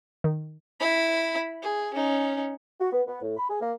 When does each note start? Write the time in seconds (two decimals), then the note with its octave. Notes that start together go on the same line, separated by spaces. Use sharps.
0.24 D#3
0.80 E4 B5
1.62 G#4
1.94 C#4 D#4
2.80 F#4
2.92 B3
3.06 B3
3.21 A2
3.37 B5
3.49 G#4
3.61 A#3